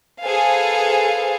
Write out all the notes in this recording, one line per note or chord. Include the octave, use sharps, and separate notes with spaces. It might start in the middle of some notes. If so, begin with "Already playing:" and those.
G#4 A4 B4 C5 F5 G#5